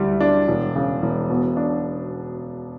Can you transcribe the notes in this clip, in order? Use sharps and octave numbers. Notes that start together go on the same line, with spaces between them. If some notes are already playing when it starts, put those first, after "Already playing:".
Already playing: D2 G3
D4
E1
C#3
E1
B2
D4